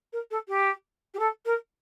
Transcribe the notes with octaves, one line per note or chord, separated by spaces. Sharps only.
A#4
A4
G4
G4
A4
A#4